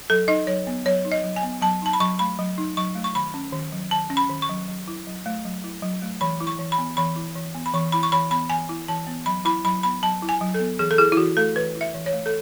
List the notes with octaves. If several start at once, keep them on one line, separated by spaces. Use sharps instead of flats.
F#3 A4
D#4 D#5
F#3 C#5
B3
F#3 C#5
D#4
D#5
F#3
G#5
B3
F#3 A5
D#4 A5
B5
F#3 C#6
A3 B5
F#3
D#4
F#3 C#6
A3
C#6
D#3 B5
C#4
D#3
F#3
D#3 A5
C#4
B5
D#3
C#6
F#3
F#3
E4
F#3
A3
F#3
E4
F#3
A3
E3 B5
E4
C#6
E3
B5
B3
E3 B5
E4
E3
B3
B5
E3 C#6
E4 B5
C#6
E3 B5
B3 B5
E3 G#5
E4
E3 A5
B3
F#3 B5
E4 B5
F#3 B5
B3 B5
F#3 A5
E4
G#5
F#3
A4
B3
E3 G#4
A4
E4 G#4
E4
E3 F#4
A3 A4
E3 B4
E4
E5
E3
C#5
A3
A4